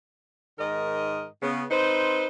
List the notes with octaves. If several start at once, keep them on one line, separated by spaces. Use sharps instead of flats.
G#2 D#3 A#4 D#5
C#3 B3
C4 D#4 B4 C5